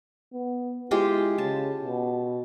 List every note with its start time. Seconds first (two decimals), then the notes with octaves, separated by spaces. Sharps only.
0.33 B3
0.91 G#3 E4 F4 G4
1.38 C#3 A5
1.84 B2